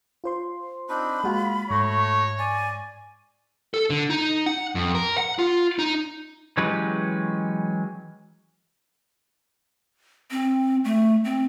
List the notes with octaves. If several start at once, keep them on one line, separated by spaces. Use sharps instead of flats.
F4 C5 C6
C4 D4 D#4 B5
G#3 A#3 F4 F#4
G#2 A3 F#4 C#5 C#6 A#6
D5 G#5
A4
D3
D#4
F#5
F2
A#4
F#5
F4
D#4
E3 F#3 G#3 C#4 G4 B4
C4
A3
C4